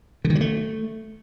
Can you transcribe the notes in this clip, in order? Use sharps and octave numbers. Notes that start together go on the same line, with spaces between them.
D3
D#3
F#3
A3